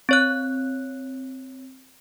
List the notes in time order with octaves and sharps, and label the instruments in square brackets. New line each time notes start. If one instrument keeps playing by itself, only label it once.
[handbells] C4 C#5 F#6